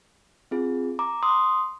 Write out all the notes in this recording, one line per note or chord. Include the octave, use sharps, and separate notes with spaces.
C4 F4 G#4
A#5 D6
C6 D#6